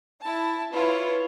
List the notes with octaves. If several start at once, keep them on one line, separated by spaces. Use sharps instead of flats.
E4 A5
E4 F4 B4 C#5